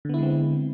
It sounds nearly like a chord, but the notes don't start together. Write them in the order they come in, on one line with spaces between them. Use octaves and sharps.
D3 B3 E4 G#3 C4